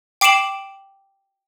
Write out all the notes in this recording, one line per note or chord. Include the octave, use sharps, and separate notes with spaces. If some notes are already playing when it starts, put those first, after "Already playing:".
G5 D6 C7 D7 E7 F#7